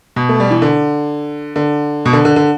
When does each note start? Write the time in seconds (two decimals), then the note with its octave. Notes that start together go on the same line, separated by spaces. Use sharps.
0.16 B2
0.29 A3
0.40 G3
0.51 E3
0.62 D3
1.56 D3
2.06 B2
2.13 D3
2.25 D3
2.36 D3